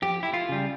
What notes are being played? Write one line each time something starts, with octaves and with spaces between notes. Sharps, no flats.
F2 G4
E4
F4
C#3 G3